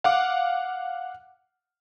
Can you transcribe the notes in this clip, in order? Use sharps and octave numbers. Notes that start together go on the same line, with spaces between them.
F5 F#5 D6